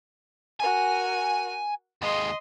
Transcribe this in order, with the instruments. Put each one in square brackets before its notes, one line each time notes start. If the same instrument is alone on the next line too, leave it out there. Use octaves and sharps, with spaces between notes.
[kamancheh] F#4 A#4 [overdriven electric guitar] G#5
[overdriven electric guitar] D#2 G#3 [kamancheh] D#5 C6